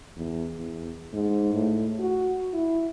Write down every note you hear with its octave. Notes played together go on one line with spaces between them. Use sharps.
E2
E2
G#2
A2
F#4
E4